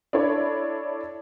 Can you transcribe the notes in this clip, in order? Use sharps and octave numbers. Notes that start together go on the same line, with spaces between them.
D4 E4 A4 C#5 D5